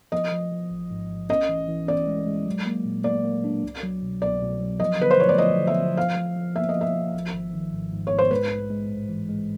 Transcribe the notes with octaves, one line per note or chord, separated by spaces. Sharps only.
F3 D#5
F3
F3
A1
G#2
A1
C#4 D#5
E3
E3
C#4 D5
G#3
G#3
F#3
A#3
A#2
A#3 D5
A#3
D4
C2
F#3
B2
C2 D5
B2
F#3
F3 D#5
D3 B4
C5
F3 C#5
D5
F3 D#5
D3
E5
F3
F3 F5
F3
F3
A#3 E5
D#5
F3
E5
F3
G#1
G#1
D#3
G#2
G#2
C#5
G#2
C5
G#3 B4
A#1
G#3
A2
E3
G#3